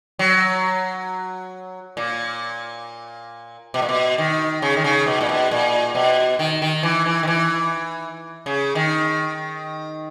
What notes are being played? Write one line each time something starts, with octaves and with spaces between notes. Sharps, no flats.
F#3
A#2
B2
A#2
B2
D#3
C#3
D#3
C#3
B2
A#2
B2
A#2
B2
D#3
D#3
E3
E3
D#3
E3
C#3
D#3